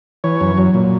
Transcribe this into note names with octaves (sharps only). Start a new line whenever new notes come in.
E3 C#5
F#2
F#3
A#2